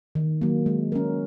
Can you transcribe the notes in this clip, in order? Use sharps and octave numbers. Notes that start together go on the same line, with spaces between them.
D#3
F#3 A#3
G#3
C#4 F#4 A#4